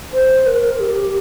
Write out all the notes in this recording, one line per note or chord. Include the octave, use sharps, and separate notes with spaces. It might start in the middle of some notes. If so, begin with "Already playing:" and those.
C5
A#4
G4